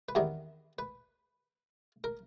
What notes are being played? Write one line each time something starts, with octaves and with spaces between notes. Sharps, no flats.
B4
E2 C3 D#3 G3 B3 A#4
B4
A#4